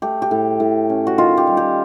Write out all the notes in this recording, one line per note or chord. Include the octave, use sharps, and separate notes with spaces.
A3 G4
G4
A2
A2
C#4
F#4
D#3 F4
G4
G3
G4